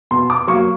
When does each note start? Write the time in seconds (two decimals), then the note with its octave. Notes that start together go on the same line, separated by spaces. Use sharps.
0.11 B2 C6
0.30 D6
0.47 F#3 A#3 C#6